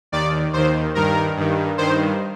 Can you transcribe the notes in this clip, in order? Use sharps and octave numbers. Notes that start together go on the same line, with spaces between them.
D#2 D#3 D5
D#2 D#3 C5
G2 D#3 A#4
G2 D#3
G2 D#3 C5